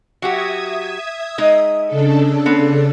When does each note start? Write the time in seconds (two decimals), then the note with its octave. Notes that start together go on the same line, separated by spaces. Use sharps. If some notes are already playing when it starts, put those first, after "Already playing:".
0.22 F#3 F#4 G4 E5 D#6 G#6
1.38 G#3 D#4 D#5
1.86 C#3 D4 A4
2.46 B3 C4